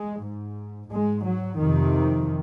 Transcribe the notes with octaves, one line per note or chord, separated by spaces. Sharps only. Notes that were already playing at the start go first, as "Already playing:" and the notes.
Already playing: G#3
G#2
G#2 G#3
F#3
F2 C3 D#3